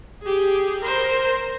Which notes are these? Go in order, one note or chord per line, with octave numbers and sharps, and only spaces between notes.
G4 G#4
A#4 C5